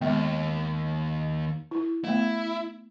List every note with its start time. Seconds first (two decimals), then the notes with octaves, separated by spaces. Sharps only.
0.01 D#2 G#3 B3
1.71 E4
2.04 A3 B3 E4